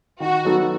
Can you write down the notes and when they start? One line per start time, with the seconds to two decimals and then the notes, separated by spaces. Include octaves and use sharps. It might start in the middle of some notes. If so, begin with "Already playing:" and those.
0.20 D#3 F#4
0.45 F#3 B3 D#4 A4